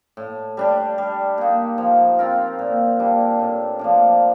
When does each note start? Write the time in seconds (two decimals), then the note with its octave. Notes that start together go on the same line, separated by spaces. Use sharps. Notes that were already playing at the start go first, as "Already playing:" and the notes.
0.17 A2
0.57 G3 D4 G4
0.98 G3
1.38 A#3 D#4
1.78 F3
2.19 C4 F4 A#4
2.59 A#2
2.99 G3 A#3 D4
3.39 A2
3.79 F3 A#3 D4